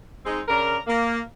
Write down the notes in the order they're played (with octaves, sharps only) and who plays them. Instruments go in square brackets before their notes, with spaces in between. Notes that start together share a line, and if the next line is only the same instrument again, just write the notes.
[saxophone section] G#3 C4 D#4
C#3 D4 A#4
A#3